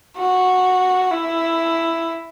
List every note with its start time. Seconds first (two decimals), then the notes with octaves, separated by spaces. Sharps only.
0.17 F#4
1.11 E4